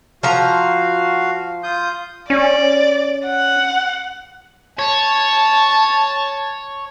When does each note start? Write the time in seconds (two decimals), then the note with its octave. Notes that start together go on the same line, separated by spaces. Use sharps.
0.23 F3 F#4 F5 A#5
1.63 F4 D#6 G6
2.30 C#4 D5
3.26 F#5
4.79 C#5 A5